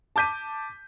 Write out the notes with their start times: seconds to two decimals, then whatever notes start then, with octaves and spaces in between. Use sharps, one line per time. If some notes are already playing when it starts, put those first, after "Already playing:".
0.16 A5 D6 G6 B6 D#7